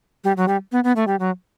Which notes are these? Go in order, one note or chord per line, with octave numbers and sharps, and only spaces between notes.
G3
F#3
G3
B3
B3
A3
G3
F#3